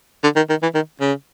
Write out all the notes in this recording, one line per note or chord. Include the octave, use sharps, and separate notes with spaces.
D3
D#3
D#3
E3
D#3
C#3